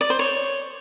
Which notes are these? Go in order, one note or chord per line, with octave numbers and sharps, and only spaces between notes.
D5
C5
C#5